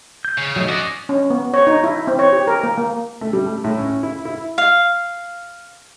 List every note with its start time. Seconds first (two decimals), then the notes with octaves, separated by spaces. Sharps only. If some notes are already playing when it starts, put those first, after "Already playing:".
0.25 G6
0.38 C#3
0.56 F#3 A3 D#4
0.69 C#4 F#4 D5 D#5
1.09 C#4
1.30 B3
1.54 C#5
1.67 D#4
1.84 E4
2.07 C4
2.19 C#5
2.32 G4
2.47 A#4
2.63 A#3
2.77 A#3
3.21 A3
3.33 G3
3.46 A3
3.64 A2
3.78 C#4
4.03 E4
4.25 E4
4.58 F5